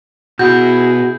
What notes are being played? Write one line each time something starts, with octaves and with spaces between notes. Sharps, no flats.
B2 E4 F#4 G#4 G6